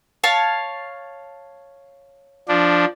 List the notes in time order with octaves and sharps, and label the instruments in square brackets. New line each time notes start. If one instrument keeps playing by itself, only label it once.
[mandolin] C#5 F5 A5
[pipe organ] F3 D4